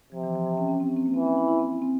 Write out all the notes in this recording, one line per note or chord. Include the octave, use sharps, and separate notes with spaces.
C3 F3
E3
F3
F3
C#4
C#4
C4
C#4
C4
A#3
E3 C4
C#4
E4
E4
C4
E4
C4